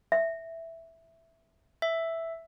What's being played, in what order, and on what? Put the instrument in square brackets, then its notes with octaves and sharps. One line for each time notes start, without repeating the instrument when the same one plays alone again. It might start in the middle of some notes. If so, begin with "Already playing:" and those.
[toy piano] E5
[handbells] E5